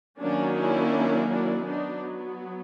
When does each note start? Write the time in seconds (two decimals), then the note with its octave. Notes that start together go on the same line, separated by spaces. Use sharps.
0.20 D#3 F#3 A#3 C#4 D4
0.56 D4 E4
1.29 D4 E4
1.65 F#3 B3 D4 D#4